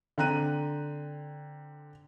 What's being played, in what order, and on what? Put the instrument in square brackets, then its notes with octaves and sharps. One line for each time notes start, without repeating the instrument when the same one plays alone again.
[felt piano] D3 C4 A#5 F#6 D#7